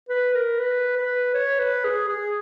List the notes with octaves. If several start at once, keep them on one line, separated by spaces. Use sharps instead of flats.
B4
A#4
B4
B4
C#5
B4
G#4
G#4